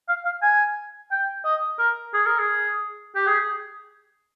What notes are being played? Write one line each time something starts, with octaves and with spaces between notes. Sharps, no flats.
F5
F5
G#5
G5
D#5
A#4
G#4
A#4
G#4
G4
G#4